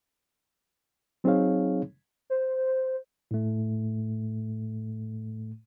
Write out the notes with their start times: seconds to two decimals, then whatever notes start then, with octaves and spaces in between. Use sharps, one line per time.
1.24 F#3 C4 D#4 G#4 C#5 F5
2.30 C5
3.31 A2 A3